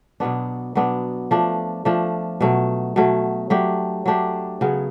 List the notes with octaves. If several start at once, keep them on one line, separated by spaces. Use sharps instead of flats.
B2 F#3 B3 D4
B2 F#3 B3 D4
F3 A3 D4
F3 A3 D4
B2 F#3 A3
B2 F#3 A3
F#3 A3 D4 G4
F#3 A3 D4 G4
C#3 F#3 B3